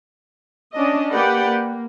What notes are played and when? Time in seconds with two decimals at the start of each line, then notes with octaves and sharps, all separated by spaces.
0.74 C#4 D4 D#5
1.12 A#3 G4 B4 D5 F#5 G5
1.47 A#3